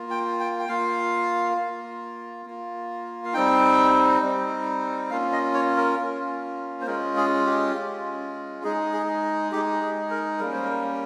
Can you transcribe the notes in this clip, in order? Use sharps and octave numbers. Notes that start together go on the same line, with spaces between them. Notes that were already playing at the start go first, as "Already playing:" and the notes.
Already playing: A#3 F4
G5
G5
G5
A#3 F4 F5
A#3 F4
A#3 F4
F5
G3 C4 D#4 G5
G3 C4 D#4
A#3 C#4 F4 F5
D#5
C#5
A#4
A#3 C#4 F4
C5
G#3 C#4 F4 A#4
G#4
G4
G#3 C#4 F4
G#3 D#4 G#4
G#4
G#3 D#4 G4
G#4
A#4
G3 A#3 C#4 A#4
C5
A#4